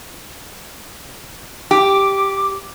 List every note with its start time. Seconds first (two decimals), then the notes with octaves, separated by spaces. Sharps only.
1.71 G4 D6